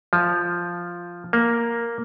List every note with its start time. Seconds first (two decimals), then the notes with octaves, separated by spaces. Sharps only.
0.13 F3
1.33 A#3